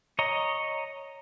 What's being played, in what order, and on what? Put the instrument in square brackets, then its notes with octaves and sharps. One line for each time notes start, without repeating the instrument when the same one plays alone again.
[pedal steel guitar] C#5 D#5 A#5